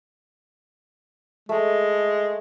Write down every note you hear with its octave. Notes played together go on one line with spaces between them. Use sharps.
G#3 A3